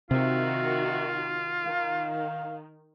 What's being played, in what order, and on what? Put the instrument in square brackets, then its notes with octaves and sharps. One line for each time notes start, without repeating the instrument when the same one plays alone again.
[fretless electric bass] C3 [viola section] D#3 F#4 [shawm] F4 [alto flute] E5
[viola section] D#3 [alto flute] F5